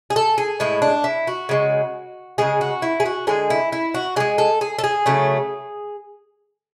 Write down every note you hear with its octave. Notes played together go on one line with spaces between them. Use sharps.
G#4
A4
G#4
A2 G#3 E4
D4
E4
F#4
C#3 G#3
C#3 G#3 G#4
F#4
E4
G#4
F#4
D3 G#3 G#4
E4
E4
F#4
D3 G#3 G#4
A4
G#4
A4
G#4
C#3 F#3 A3